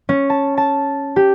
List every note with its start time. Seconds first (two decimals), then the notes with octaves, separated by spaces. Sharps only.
0.09 C#4
0.30 A5
0.57 A5
1.16 G4